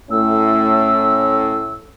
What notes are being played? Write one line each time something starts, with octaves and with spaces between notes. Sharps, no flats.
A2 A3 C#4 E6